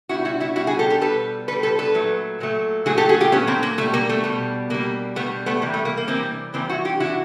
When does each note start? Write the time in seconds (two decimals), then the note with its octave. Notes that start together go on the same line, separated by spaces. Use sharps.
0.09 B2 E4 F#4
0.14 G3
0.25 E4 F#4
0.40 E4 F#4
0.56 B2 G3 E4 F#4
0.67 F#4 G#4
0.79 G4 A4
0.90 G4 A4
1.01 B2 G3 A4 B4
1.48 B2 A4 B4
1.52 G3
1.63 A4 B4
1.79 A4 B4
1.94 A#2 F#3 A3
2.40 A#2 F#3 A3
2.86 A#2 F#3 A3 F#4 G#4
2.98 G4 A4
3.09 F#4 G#4
3.21 F4 G4
3.32 A#2 F#3 A3 B3 C#4
3.47 A#3 C4
3.63 A#3
3.78 B2 A3
3.81 G3
3.94 A#3
4.09 A3
4.24 B2 G3
4.70 B2 G3 A#3
5.16 B2 G3 A3 B3
5.46 A3 B3
5.62 C3 E3 G3 A#3
5.74 A3
5.85 A#3
5.97 A#3
6.08 C3 E3 G3 A#3 C4
6.54 C3 E3 G3 A#3 C4
6.69 E4 F#4
6.85 F4 G4
7.00 C3 E3 G3 E4 F#4